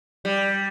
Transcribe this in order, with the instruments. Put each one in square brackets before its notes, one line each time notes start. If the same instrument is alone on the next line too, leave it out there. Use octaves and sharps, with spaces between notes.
[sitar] G3